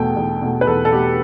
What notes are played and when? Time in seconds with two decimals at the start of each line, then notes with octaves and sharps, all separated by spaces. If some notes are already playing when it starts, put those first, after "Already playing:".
Already playing: E2 B2 A3 G5
0.16 E2
0.42 B2 A3
0.61 B4
0.67 E2 A4
0.85 A4
0.92 B2 A3 G4